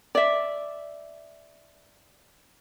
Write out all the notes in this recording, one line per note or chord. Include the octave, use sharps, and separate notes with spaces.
D5 E5